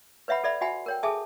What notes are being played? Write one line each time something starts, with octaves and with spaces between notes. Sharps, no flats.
B4 C#5 E5 F#5 B5
A4 D5 E5 B5
F#4 E5 F#5 G#5 B5
A#4 C#5 G5
G#4 A4 E5 G#5 A5 D#6